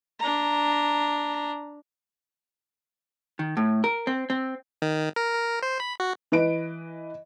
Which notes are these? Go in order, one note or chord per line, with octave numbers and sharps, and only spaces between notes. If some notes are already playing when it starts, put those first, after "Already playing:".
D4 A#5
D#3
A2
A#4
C4
C4
D#3
A#4
A#4
C5
B5
F#4
E3 B4 D#5 D7